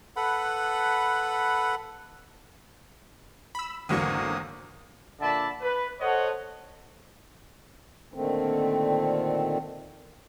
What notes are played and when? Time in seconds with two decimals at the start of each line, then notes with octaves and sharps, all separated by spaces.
0.16 A4 B4 F#5 B5
3.55 B5 E6
3.89 G#1 E2 D3 F#3 A#3 C#6 D#6
5.20 A#2 D3 D5 E5 A5 B5
5.61 B4
6.00 A4 C5 C#5 D#5 F#5
8.14 A#2 D3 D#3 A3 C4